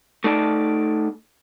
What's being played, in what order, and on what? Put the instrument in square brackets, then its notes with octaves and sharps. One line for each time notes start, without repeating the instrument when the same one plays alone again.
[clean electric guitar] A3 D#4 D5 A5